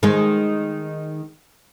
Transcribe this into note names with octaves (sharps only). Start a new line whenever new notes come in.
D#3 G#3